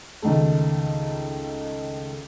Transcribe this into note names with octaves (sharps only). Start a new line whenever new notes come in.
C#2 D#3 A3